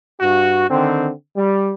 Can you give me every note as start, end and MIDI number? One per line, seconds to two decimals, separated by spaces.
0.20 0.66 43
0.20 0.66 66
0.68 1.10 50
0.68 1.10 51
0.68 1.10 60
1.36 1.72 55